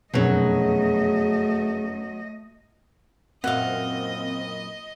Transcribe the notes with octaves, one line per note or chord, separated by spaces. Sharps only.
F1 F#2 B2 F#3 A3 G#4 D#5
F#2 A#2 E3 C4 D#5 F5 F#5